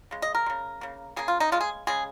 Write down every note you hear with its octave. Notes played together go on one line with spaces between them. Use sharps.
C#3 G#3
D#5
A#4
G#3
C#3
C#3 A#3
C#3 A#3 G#4
F4
D#4
C#3 G#3 F4
G#4
C#3 G#3 G#4